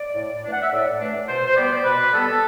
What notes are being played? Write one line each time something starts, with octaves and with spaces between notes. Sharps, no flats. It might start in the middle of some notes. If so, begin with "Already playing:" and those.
Already playing: D5
A2
E3 A3 D4
F#5
E5
A2 D5
E3 A3 D4
B2 C5
C5
G3 B3 D5
B2 B4
G3 B3 A4